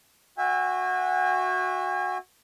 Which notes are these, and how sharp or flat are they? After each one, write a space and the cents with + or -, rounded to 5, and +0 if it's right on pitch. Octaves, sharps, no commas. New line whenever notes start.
F#4 -10 E5 +0 G#5 -40